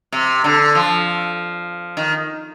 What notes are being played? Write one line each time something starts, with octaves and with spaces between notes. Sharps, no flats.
C3
D3
F3
D#3